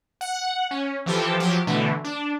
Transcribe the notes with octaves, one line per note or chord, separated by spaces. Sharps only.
F#5
C#4
E3 F3 G4 A4
F3 F#3 G4
B2 D3 E3 A3
D4